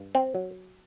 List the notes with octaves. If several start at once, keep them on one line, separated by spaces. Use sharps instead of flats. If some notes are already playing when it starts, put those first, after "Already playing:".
Already playing: G2
C4
F#3